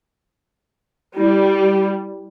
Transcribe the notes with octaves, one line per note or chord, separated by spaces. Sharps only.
G3 E4